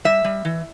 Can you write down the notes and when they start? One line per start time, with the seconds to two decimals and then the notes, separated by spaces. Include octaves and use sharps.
0.05 G3 E5
0.24 G3
0.45 E3